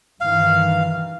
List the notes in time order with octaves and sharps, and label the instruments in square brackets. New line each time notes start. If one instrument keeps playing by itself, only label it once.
[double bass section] G2 D#3 E3 [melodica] F5